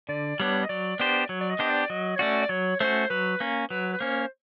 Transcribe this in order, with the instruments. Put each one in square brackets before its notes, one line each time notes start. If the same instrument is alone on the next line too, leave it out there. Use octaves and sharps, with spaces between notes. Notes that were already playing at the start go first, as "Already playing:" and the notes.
[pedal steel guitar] D3 [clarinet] D5
[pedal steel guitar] G3 B3 D4 [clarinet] C#5
[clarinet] D#5
[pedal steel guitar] F#3 [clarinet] D5
[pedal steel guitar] B3 D4 G4 C5 [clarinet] D5
[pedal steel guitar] F#3 [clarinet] C#5
[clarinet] D5
D#5
[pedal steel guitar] B3 D4 G4 C5
[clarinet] D5
[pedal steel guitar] F#3 [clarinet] D#5
[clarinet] C#5
[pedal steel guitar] A3 C#4 F#4 [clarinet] D5
[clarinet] D5
[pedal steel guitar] F#3 [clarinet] C#5
[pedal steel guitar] A3 C#4 F#4 [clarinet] C5
[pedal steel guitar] F#3 [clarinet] B4
[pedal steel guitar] A#3 C#4
[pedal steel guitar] F#3 [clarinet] B4
[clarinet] B4
[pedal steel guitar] A#3 C#4 [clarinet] C5